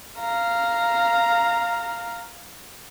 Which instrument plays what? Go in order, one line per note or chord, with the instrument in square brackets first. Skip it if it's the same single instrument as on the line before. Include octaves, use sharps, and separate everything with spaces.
[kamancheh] F5 A#5